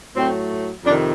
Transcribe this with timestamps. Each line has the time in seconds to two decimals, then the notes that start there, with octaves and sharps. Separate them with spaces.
0.16 A2 F#3 A3 C4
0.84 F2 C3 D#3 D4